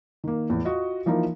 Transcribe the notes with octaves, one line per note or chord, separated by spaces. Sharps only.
D#3 A#3
E2 A2
F4 F#4 D#5
E3 F3 A#3 D#4 F4 A#4